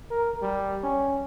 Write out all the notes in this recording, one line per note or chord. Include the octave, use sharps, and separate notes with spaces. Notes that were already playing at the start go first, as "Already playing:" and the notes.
A#4
G3
C#4